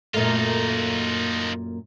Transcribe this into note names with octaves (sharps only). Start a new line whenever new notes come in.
F#2 A#2 A3 D#4 F4